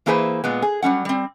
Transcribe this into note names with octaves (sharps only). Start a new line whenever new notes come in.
E3 A#3 E4 G#4 B4 C5
A#2 G#3 B3
G#4
F#3 G3 C#4 F#5
G3 C4